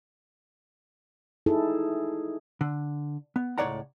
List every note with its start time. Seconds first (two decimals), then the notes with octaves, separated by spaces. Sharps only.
1.46 D#4 E4 G#4 A4
2.61 D3
3.36 B3
3.58 C#2 A2 C#5 D5 F#5 A#5